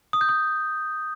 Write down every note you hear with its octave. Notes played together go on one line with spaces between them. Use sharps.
D#6
G6
D#6